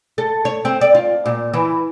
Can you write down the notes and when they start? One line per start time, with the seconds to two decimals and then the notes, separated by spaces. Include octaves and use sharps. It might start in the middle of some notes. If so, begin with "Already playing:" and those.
0.18 A4
0.45 C#5
0.65 C4
0.81 D5
0.95 F4
1.26 A#2
1.54 E3